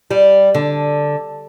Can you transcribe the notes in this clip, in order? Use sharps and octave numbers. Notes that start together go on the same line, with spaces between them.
G3
D3